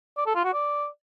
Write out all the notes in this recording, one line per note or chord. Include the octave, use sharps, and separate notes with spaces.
D5
A4
F4
F#4
D5